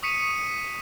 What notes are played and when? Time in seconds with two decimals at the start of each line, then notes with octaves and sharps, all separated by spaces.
0.03 C#6 D#6 B6 C#7 D#7 E7